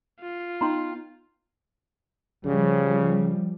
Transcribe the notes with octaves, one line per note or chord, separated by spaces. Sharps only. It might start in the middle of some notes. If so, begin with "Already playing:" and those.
F4
B3 D#4 G5 A#5 C6
C#3 F3 G3